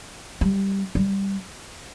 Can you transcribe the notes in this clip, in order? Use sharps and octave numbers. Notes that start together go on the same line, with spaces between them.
G3
G3